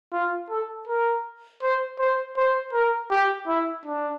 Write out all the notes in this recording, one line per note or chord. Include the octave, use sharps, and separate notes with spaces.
F4
A4
A#4
C5
C5
C5
A#4
G4
E4
D4